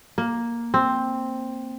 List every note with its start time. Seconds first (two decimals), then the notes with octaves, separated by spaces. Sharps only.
0.18 A#3
0.74 C4